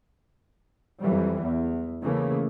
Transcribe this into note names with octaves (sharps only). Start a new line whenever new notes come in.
F2 E3 F#3 G3
E2
C#3 E3 A3 A#3